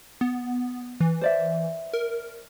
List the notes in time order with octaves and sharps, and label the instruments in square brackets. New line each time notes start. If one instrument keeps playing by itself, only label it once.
[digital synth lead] B3
E3
[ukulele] C5 D5 E5
[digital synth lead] A#4